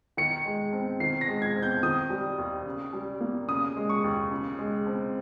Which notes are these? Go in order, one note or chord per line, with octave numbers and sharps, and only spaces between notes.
D#3 C#7
G#3
C4
D#3 C7
A#6
G#3
G#6
C4
G6
D#3 D#6
G3
D#2
C#3
G3
A#3
C#3 D#6
G#3
C#6
D#2
C#3
G#3
C4